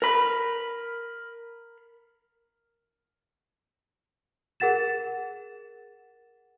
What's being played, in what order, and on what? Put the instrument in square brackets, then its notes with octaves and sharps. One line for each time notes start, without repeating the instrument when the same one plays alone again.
[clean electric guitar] A#4 B5
[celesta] G#4 A#4 F#5 A6 E7